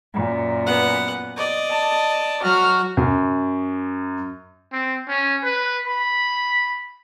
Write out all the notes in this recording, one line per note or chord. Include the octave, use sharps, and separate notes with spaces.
F#2 A#2
B3 F#5
D5 D#5
A5
F#3 F#4 F6
F#2
C4
C#4
B4
B5